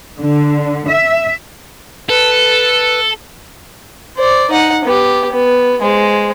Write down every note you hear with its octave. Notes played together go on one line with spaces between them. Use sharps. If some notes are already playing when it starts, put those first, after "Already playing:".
D3
E5
A4 B4
C5 D5
D#4 F#5
B3 G4
B3
G#3 C5